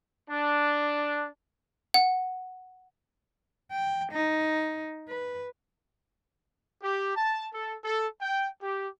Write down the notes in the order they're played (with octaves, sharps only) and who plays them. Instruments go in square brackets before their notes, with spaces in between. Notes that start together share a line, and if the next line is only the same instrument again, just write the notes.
[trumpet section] D4
[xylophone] F#5
[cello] G5
D#4
B4
[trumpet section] G4
A5
A4
A4
G5
G4